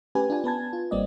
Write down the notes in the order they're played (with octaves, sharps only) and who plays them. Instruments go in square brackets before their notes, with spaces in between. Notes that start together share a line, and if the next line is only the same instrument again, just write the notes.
[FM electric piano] A3 C#4 G4 B4 G#5
D4 F4 G#5
B3 B4 A5 G#6
F4
G#1 G3 A#3 C4 D5 D#5